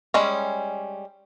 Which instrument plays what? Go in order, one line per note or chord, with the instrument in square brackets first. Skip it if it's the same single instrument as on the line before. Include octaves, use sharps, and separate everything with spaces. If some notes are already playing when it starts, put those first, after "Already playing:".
[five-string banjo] G3 G#3 C#4